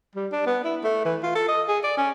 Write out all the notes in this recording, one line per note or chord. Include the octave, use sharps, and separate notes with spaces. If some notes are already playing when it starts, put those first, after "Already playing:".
G3
D4
B3
E4
A3
E3
F4
A4
D#5
G#4
D5
C#4